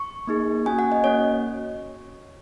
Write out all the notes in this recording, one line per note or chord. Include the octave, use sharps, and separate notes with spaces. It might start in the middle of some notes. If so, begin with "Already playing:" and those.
Already playing: C#6
A#3 D#4 G#4
A#3 C#4 F#4 G#5
F#5
D#5
A#3 C#4 F#4 C#5